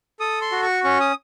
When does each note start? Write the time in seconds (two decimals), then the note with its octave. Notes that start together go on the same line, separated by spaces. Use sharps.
0.20 A4 D#6
0.41 C6
0.52 F#4
0.63 C#6
0.84 C#4 C#6
1.00 D#6